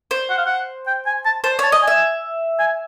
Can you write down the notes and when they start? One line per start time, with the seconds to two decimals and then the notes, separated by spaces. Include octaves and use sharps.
0.11 C5
0.30 F#5
0.38 F5
0.46 F#5
0.87 G5
1.06 G#5
1.25 A5
1.44 C5 A5
1.59 C#5 A5
1.72 D#5
1.82 G#5
1.87 E5
2.59 G#5